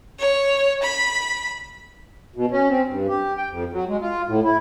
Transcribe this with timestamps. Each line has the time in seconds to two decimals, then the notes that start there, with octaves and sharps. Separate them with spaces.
0.19 C#5
0.82 B5
2.36 B2
2.51 C#4
2.69 C4
2.87 G2
3.08 G4
3.37 G5
3.50 F2
3.73 F#3
3.88 G#3
4.01 F4
4.28 A2
4.44 E4